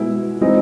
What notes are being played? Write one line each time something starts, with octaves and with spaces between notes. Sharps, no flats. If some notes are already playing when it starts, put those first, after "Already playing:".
Already playing: B2 G#3 B3 E4
E3 G#3 C4 D#4